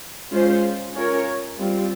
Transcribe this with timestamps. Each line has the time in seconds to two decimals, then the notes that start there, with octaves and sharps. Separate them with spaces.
0.31 G#3 C#4 F4 C5
0.94 C#4 F4 A#4 C#5
1.58 G3 C4 F4